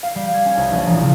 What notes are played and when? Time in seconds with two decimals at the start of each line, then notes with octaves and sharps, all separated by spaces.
0.03 F5
0.15 G3
0.33 G#6
0.46 C#4
0.57 C2
0.72 A#1
0.86 A1
1.01 C#3